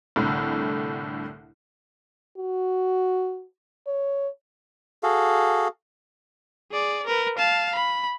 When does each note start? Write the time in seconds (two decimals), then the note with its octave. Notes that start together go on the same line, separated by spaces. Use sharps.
0.16 C2 A2 D3
2.38 F#4
3.87 C#5
5.03 F#4 G#4 A4 F5
6.71 G#4 D5
7.06 A#4 B4
7.38 F5 A5
7.75 B5